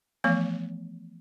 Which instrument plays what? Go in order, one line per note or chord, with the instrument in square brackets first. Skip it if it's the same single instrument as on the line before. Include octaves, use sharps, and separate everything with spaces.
[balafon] E3 F3 A3 B3 F5